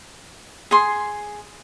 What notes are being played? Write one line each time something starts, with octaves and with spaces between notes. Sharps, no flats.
G#4 C6